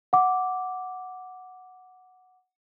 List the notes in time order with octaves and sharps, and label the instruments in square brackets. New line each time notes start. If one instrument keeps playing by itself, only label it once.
[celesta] F#5 D6